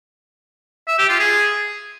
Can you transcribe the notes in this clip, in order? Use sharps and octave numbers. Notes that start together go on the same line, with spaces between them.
E5
G4
F4
G#4